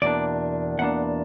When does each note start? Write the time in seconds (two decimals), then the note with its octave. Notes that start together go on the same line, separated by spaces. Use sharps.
0.02 E2 B2 A#3 D4 D5
0.79 E2 B2 A#3 D4 F#5